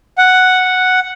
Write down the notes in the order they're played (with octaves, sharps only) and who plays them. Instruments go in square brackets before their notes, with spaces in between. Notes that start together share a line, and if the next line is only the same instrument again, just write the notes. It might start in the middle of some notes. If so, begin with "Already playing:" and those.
[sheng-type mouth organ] F#5